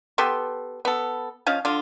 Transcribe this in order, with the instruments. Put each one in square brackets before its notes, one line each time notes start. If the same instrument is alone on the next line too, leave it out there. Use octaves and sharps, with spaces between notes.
[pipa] B3 G4 A4 C6
B3 A4
F3 C#4 D#5 F5
D3 F4